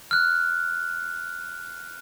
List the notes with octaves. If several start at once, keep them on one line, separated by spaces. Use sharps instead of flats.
F6 F#6